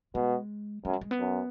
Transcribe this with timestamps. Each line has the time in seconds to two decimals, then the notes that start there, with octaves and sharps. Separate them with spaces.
0.15 B2 G#3
0.85 F#2 G#3
0.93 F#3
1.01 G#3
1.11 B3
1.19 F#2